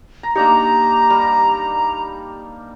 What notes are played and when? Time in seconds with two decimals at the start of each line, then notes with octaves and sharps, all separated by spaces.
0.23 A#5
0.36 A#3 D4 D#4 G4 A#5
1.10 G3 A#4